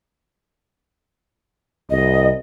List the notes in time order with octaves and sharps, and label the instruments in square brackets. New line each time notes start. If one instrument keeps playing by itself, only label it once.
[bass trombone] C2 [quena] D#5